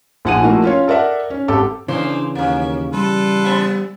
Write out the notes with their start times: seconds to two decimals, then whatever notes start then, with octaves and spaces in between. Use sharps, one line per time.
0.25 A#1 F3 F#5 G#5 D#7
0.43 F3 A3 A#3 E4 F#4
0.63 C#4 F4 C#5
0.88 A4 A#4 D5 E5 F#5
1.30 C#4
1.48 G#1 G4 A4 D6
1.88 C#3 E3 A#3 D4 C5
2.35 D#2 A#3 C#4
2.93 B2 G3 F4 A4 B4
3.44 B3 E5